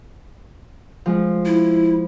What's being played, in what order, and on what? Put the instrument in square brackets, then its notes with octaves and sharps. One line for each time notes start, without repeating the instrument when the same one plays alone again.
[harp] F3 G#3
[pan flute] E4